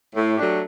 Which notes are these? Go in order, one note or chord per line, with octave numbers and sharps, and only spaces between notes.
A2
F#3 A3 D4 G4